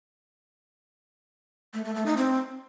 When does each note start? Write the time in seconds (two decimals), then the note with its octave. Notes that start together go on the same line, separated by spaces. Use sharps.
1.74 A3
1.85 A3
1.95 A3
2.06 D#4
2.17 C4